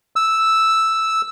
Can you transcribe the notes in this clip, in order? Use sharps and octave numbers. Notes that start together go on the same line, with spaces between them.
E6